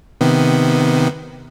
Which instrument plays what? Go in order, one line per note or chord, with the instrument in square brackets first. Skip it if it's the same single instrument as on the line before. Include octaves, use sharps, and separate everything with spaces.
[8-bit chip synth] C3 D#3 B3